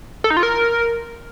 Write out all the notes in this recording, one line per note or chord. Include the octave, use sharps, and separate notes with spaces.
A4
D#4
F4
A#4